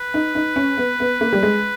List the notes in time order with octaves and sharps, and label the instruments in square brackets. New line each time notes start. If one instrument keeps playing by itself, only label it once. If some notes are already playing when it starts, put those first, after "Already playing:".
Already playing: [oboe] B4
[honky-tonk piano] D#4
D#4
C#4
B3
B3
A#3
G3
G#3